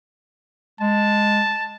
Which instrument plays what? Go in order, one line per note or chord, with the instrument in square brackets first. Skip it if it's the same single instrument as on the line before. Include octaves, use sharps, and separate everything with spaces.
[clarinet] G#3 [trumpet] A5